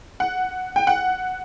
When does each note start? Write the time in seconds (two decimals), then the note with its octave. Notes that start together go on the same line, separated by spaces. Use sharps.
0.20 F#5
0.76 G5
0.87 F#5